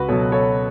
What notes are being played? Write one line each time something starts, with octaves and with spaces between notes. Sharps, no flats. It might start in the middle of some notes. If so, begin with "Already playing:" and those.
Already playing: C#2 F#4 B4
B2 F#3 A4 C#5
A4 C#5